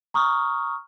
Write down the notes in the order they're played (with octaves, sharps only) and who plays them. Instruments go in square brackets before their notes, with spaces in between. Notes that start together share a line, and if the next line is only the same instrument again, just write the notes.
[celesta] A#5 C#6 D#6 F6